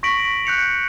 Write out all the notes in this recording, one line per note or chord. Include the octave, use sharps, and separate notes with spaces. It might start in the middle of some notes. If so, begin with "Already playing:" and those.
C#6 A#6 B6 D7 F#7
F#6 G6 C#7 F7